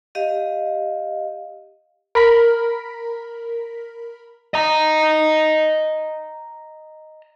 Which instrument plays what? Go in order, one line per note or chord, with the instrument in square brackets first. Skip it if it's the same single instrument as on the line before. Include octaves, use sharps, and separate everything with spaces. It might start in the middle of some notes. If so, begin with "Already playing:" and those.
[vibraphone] G4 D#5 F5
[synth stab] A#4 B5 B6
[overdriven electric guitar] D#5 A#5